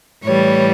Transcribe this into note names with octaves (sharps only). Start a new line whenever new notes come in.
A2 E3 G3 C#5